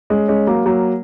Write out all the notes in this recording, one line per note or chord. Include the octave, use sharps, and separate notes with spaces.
G#3 C#4
G#3 C#4
F#3 A#3
F#3 A#3